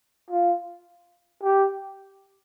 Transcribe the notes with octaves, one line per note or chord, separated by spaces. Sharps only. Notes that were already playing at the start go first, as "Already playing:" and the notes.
F4
G4